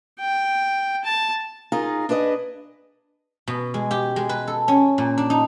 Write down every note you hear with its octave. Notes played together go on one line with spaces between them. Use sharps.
G5
A5
D#4 F4 G#4 A#4
D4 G#4 B4 D#5
B2
G#3
G4
G#3
B4
A4
C#4
A#2
D4
D#4